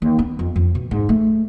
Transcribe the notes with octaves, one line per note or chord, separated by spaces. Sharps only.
D#2
B3
F2
F2
B2
G#2
A3